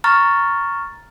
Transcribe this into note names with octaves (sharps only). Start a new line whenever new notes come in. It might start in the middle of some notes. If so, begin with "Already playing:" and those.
A#5 C#6 F6 A6